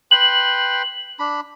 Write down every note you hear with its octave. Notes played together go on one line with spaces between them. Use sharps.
B4 G5 C6 F#7
D4 B5